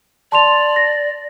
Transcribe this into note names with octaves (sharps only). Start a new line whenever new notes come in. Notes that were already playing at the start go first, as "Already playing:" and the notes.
D5 A5 C6 F7
A#6